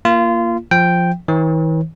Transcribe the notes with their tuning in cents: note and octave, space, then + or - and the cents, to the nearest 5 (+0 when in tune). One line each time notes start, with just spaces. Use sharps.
A#3 +0 F4 -25
F3 +0 G5 +0
E3 -45 C#5 -45